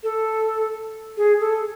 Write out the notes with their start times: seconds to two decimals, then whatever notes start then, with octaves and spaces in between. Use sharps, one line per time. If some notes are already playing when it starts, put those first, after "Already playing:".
0.03 A4
1.17 G#4
1.40 A4